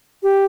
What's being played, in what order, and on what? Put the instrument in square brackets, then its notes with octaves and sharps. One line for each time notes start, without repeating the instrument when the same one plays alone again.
[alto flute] G4